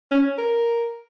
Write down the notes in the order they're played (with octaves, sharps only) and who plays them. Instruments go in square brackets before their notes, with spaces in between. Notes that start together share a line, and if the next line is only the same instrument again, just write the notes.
[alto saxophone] C#4
A#4